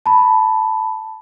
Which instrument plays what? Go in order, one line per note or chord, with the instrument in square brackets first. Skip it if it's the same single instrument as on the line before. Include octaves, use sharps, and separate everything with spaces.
[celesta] A5 B5